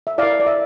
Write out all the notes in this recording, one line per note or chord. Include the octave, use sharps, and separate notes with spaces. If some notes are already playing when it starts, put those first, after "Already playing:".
E5
E4 A#4 D5 F5
D5
E5